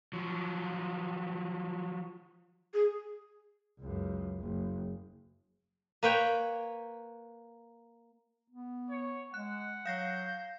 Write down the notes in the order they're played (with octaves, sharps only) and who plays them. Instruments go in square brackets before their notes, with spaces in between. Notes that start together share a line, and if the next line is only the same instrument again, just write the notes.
[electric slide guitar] F3 F#3
[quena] G#4
[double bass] C#2 F#2
F#1
[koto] A#3 B4 C#5 G5
[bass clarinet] B3
[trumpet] C#5
[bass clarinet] G#3 [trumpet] F#5 [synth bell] F#6
[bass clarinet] F#3 [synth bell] F5 A#6 C7 [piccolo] G6